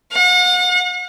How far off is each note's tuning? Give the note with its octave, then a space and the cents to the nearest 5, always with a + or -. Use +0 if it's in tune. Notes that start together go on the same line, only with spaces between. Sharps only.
F#5 -40